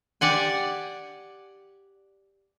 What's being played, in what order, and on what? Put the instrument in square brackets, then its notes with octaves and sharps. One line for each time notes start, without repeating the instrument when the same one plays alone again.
[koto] G4 D5 F#5 G#5